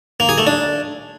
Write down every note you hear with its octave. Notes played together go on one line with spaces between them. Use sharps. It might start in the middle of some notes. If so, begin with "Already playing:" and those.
A#3
G#4
A3
D4